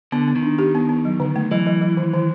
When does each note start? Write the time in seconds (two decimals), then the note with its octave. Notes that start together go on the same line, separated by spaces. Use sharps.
0.12 D3 B3
0.28 B3
0.36 D#3
0.43 D4
0.59 G4
0.75 B3
0.89 B3
1.05 F#3
1.20 D3
1.36 A3
1.51 E3 F#3
1.66 F#3
1.81 F#3
1.97 D#3
2.13 D#3